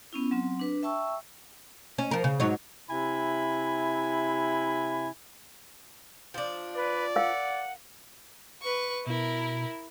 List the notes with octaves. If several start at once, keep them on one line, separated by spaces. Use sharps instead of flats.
B3 C#4 E4
F#3 C4
D4 B4
E5 G5 A5 C#6 E6
C#4
F3 A#4
C#3
G#2 F#3 C#5
C3 E4 G#5 B5
F3 D4
B4 D5
A#4 F5 F#5
B4 C#6
B2 E4 A#4